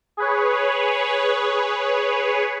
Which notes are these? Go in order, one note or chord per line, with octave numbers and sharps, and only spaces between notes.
G#4 B4 C#5